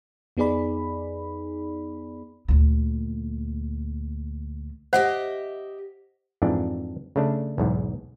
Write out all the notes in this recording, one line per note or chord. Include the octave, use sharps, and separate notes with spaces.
F2 B3 D#4 G#4 D5 B5
D2 A#2
G4 C5 D#5 E5 F#5
F2 G#2 E3 D4
C#3 A3 D4
B1 E2 G#2